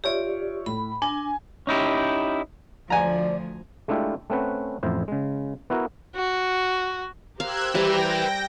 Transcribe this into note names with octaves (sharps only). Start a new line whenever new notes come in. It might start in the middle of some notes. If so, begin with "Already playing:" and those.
F4 G4 C#5 D5 E5
A2 B5
D4 G#5
C#4 D#4 E4 G4
D2 F3 D5 G#5 A#5
G#3 A3 D4 E4 F4 G4
A3 C4 C#4 B4 F#5
A1 F2 E4 C5
C#3 G#3
B3 E4 F#4 A#4
F#4
G4 A#4 C5 F5 E6 F#6 G#6
G3 B4 E5 G5 A#6